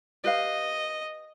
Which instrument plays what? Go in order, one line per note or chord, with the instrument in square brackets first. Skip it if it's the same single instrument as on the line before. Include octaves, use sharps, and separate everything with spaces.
[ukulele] G4 B4 F5 [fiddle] D#5